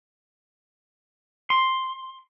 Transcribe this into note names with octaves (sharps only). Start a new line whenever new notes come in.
C6